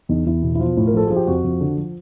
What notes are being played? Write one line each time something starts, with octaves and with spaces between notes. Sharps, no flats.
E2 D#4
E2 E4
B2
E4
F3 F4
A2
A#4
F3 A4
F3 G#4
G4
F2 F#4
F2
D3
F3